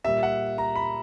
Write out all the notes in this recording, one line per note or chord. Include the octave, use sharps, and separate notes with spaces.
A#2 G3 E5
F#5
A#5
B5